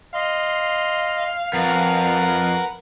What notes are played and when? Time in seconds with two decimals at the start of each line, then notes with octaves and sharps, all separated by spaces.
0.14 D#5 F5 C6
1.53 F2 A#4 B4 F#5